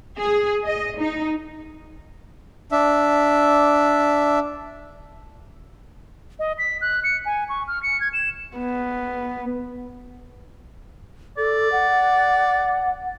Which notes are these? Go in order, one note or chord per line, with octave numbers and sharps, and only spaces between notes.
G#4
D#5
D#4
D4 E5
D#5
B6
F#6
C#7
G#5
C#6
F6
C#7
G#6
E7
B3
A4 D5
F#5